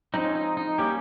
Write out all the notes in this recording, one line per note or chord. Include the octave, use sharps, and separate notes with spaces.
F3 G#3 C4 D#4
C#4
D#4
D#4
G3 A#3 C#4 G4